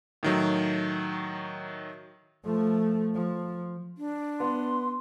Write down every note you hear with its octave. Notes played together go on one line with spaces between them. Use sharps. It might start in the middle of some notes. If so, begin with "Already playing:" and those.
A2 D#3 F#3
F3 A3
F3
D4
B3 C6